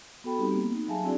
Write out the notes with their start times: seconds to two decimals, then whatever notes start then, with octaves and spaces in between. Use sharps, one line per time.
0.24 B3 F#4 A4 G5 B5
0.39 G3 C4 D#4 G4
0.52 A#3 B3
0.72 D#4
0.88 F#3 G#4 E5 F5 G#5 A5
1.04 C4 D4 E4 F#4 G#4 D5